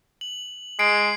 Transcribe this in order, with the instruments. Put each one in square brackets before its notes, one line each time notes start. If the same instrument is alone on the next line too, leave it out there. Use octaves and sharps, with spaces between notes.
[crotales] F#7
[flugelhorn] G#3 [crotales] C7 D7